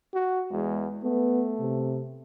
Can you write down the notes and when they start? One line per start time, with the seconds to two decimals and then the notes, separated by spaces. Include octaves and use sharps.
0.14 F#4
0.51 E2 G#3
1.03 A3 B3
1.60 C3